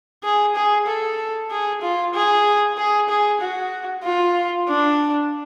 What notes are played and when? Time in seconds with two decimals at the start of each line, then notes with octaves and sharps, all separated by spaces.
0.24 G#4
0.56 G#4
0.87 A4
1.51 G#4
1.82 F4
2.14 G#4
2.77 G#4
3.09 G#4
3.41 F#4
4.04 F4
4.68 D4